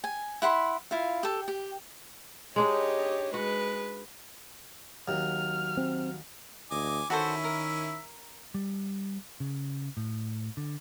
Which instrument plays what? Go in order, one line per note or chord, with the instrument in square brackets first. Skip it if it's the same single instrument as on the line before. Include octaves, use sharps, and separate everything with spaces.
[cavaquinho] G#5
E4 F#5 B5 C6
E4 F4 F5
G4 A4
G4
[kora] G#3 D4 D#4 [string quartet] G4 C#5 D#5
[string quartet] G#3 B4 [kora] F#4
[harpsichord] D#2 [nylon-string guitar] F#3 [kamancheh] F6
[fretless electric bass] C4
[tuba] D2 [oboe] D#5 [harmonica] G#5 D6
[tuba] D#3 [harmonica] C#4 E4 [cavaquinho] F#4 A4 C5 [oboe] E5
[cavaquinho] A#4
[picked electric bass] G3
C#3
A2
D3